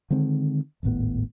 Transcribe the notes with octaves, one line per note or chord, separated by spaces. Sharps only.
D3 D#3 G#3 C4
D#1 G#1 A2 B3